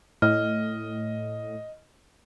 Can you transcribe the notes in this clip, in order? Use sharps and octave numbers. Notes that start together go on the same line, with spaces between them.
A2 D#5 F6